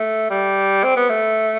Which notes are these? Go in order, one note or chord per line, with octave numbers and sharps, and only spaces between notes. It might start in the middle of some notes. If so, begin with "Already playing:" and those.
Already playing: A3
G3
C4
B3
A3